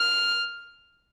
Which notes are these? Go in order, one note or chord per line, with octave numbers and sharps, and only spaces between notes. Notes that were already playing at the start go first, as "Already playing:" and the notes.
Already playing: F6